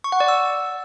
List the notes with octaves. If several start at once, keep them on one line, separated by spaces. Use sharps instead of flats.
C#6
F#5
D5
E6